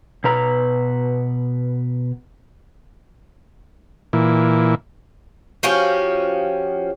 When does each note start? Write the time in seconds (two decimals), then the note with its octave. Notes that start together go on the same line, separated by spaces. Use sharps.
0.24 B2 B4 A#5
4.13 A#2 E3
5.63 F3 C#4 F#4 G4